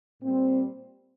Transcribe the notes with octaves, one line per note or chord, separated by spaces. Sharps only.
A#2 G3 C4